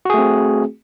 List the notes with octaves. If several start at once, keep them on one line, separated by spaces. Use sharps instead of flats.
A3 C4 F#4 G#4